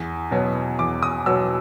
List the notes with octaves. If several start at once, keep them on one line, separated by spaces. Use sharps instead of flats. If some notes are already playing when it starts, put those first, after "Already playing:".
Already playing: E2
B2 F#3 B3
E2 D6
D#6
B2 F#3 B3 E6